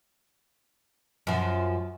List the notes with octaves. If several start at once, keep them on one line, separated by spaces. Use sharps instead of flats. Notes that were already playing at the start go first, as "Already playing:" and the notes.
F#2 F3